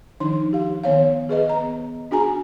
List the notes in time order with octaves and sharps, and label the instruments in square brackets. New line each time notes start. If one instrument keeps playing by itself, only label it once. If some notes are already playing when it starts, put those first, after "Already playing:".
[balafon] D#3 F3 D4 D#4 C6
G4 F5
D#3 B3 C#5 F5
G#4 B4 D#5
B3 A#5
D4 F#4 G#4 G#5 A#5